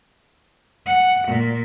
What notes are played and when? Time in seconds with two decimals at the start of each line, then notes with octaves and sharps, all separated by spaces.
0.86 F#5
1.28 A#2